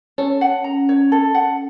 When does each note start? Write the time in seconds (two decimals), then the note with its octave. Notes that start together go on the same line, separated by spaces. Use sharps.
0.18 C#4 A4
0.41 F#5
0.64 A#5
0.89 C#5
1.12 A4
1.35 F#5